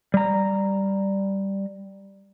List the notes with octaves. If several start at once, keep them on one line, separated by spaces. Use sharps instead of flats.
G3 A#5